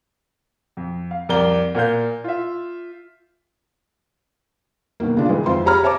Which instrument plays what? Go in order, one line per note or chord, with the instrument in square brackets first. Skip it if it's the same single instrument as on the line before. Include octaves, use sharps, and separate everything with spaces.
[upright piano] F2
F5
C2 F2 A#4 D5 A#5 G7
A#2 A#4 F5 G6
F4 E5
[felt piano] B2 D#3 F#3 A#3
C#3 D4 F4
G#2 D#3 E3 G#3
F2 F4 C5 E5 C6
G4 G#4 C#5 A#5 B5 F6
C5 C#5 E5 A5 A#5 D6